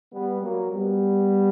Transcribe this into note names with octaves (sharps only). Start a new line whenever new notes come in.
G3 B3
F#3 A#3
G3 B3